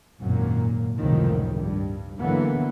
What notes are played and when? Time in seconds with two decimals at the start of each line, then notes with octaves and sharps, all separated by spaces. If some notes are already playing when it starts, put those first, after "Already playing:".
0.20 G#1 F#2 A#2 A#3
0.98 C#2 F#2 A2 C3 D#3 F3
1.55 G2
2.19 D3 E3 F#3 A#3 B3